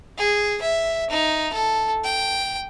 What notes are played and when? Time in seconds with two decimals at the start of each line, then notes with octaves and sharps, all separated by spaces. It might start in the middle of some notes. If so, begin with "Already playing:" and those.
0.18 G#4
0.61 E5
1.10 D#4
1.53 A4
2.04 G5